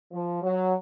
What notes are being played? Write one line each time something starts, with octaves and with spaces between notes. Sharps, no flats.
F3
F#3